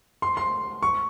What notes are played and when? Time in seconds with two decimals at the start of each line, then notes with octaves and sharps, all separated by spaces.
0.22 C6
0.37 C6
0.83 C#6